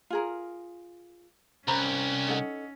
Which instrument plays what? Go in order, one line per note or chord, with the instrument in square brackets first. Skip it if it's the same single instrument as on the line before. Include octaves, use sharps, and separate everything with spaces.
[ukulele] F4 G#4 A#4
[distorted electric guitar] C2 [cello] C#4 [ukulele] C5 A#5 B5
[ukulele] D#4 A4 F#5